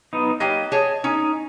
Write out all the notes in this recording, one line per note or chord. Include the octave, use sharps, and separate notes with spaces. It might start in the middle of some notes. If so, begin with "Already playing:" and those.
B3 D#4
F#3 A#3 G4 D#5
G#4 C#5 A5
C#4 D#4